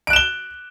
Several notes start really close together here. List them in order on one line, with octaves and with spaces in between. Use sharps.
D7 F#6 E7 G7